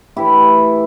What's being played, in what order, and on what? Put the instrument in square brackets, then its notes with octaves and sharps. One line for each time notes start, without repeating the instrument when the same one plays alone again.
[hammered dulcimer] A2 E3 E4 G4